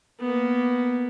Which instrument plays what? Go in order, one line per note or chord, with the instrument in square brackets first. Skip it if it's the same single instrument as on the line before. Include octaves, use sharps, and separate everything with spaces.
[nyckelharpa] A#3 B3